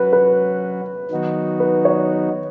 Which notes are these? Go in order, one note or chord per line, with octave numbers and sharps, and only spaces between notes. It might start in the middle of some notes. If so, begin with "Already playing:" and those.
Already playing: F#3 C#4 F#4 B4
B4
D#3 F#3 B3 D#4 F#4
B4
C#5